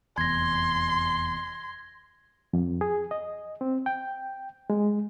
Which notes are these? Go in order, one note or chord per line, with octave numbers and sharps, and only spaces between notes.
F1 E2 C6 G#6 A#6
F2
G#4
D#5
C4
G5
G#3